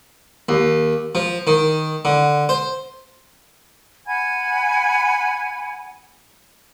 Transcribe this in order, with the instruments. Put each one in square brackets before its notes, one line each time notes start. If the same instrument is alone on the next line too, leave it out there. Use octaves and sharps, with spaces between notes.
[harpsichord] D#2
F3
D#3
D3
C5
[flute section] F#5 G#5 B5 G#6